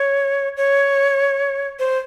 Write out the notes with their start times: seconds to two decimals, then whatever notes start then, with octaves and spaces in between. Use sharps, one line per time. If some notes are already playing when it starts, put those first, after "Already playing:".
Already playing: C#5
0.57 C#5
1.79 C5